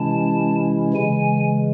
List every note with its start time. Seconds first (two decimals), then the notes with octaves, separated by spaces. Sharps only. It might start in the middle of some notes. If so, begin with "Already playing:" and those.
Already playing: C3 E3 G#3 C#4 E4 A5
0.94 C#3 E3 G#3 G#5